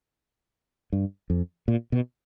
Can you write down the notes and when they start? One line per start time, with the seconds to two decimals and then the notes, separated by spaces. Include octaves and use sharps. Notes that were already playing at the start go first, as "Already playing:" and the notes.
0.93 G2
1.30 F2
1.68 A#2
1.92 B2